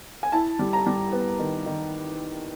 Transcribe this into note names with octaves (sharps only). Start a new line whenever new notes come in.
G#5
E4 A5
G3
A#5
G3
B3
D#3
D#3